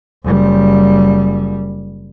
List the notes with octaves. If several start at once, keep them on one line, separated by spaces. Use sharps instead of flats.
F#1 G3